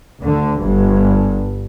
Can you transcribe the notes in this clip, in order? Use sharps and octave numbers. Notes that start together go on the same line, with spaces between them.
D2 D3
G1 G2